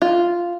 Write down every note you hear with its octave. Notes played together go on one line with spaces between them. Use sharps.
F4